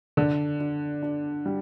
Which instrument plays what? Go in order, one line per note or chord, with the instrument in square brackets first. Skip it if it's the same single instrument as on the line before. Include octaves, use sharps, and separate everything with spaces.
[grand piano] D3 [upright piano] D4
[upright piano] D4
D4
G3